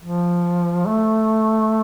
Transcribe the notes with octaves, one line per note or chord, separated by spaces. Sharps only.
F3
A3